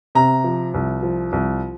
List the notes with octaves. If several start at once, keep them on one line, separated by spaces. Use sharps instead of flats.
C3 A#5
F3
C2
F3
C2